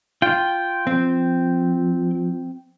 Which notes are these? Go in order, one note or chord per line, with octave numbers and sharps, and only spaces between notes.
F4 G5
F3 C4